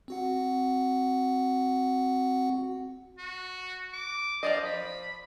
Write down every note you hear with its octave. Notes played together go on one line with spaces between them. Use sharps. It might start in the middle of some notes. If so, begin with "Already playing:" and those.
C4 F#4 F#5
F#4
D6
F3 C5 D5 D#5
B5